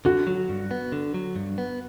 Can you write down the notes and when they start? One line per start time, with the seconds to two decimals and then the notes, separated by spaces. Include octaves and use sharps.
0.05 D3 F#4
0.27 F#3
0.49 G2
0.71 B3
0.92 D3
1.14 F#3
1.36 G2
1.58 B3